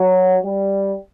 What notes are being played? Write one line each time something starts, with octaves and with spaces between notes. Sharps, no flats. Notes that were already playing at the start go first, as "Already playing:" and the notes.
Already playing: F#3
G3